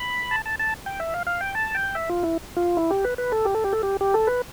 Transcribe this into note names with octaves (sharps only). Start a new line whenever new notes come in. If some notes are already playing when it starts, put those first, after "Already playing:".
Already playing: B5
A5
A5
A5
G5
E5
F5
F5
G5
A5
G5
E5
F4
E4
F4
E4
G4
B4
B4
A4
G4
A4
G4
A4
G4
G4
A4
B4